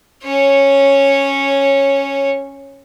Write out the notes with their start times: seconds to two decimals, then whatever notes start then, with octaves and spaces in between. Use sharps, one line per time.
0.22 C#4 C#5